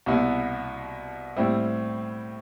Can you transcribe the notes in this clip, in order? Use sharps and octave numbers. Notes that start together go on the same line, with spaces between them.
C2 B2 B3 E4
A2 G3 C4 E4